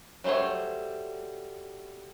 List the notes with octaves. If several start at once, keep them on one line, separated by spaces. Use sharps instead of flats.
F#3 G3 A3 C5 C#5